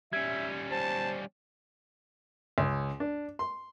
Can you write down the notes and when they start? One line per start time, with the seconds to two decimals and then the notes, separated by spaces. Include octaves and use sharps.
0.13 G3 C#4 E5 G#6
0.71 C5 A5
2.58 C#2
3.00 D4
3.39 C6